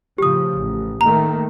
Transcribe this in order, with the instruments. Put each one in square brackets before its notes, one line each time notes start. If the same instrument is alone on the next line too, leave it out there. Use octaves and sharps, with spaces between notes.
[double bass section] A2 C#3 F3 [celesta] G4 D#6
[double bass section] A1
[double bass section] D#3 A3 A#3 [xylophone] A#5